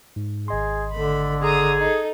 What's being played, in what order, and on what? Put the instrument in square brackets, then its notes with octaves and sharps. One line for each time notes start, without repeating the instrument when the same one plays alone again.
[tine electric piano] G#2
[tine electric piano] G#1 D#5 C6 [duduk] G#4
[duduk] D3 [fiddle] A3 B5
[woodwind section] G#4 [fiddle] A#5 D#6
[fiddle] D#4 A4